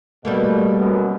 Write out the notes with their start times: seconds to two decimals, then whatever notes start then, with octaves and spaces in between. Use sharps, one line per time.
0.25 B2 G3 A3 A#3
0.79 F#2 B2